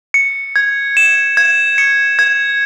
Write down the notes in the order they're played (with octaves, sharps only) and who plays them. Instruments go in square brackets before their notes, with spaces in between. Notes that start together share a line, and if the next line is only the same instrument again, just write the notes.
[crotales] C#7
G#6
E7
G#6
C#7
G#6